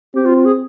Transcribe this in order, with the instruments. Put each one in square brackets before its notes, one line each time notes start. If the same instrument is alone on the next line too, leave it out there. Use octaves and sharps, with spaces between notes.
[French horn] C4 [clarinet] G4
[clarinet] F4
F4
G#4